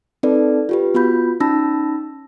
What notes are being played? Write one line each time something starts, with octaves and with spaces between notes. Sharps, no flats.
C4 D#4 A4 B4 D5
F4 G4 B4
B3 F4 F#4 B5 G6
C#4 D#4 A5 B5 E6 A#6